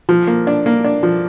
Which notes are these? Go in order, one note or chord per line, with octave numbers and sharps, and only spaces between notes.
F3
A#3
D4
A#3
D4
F3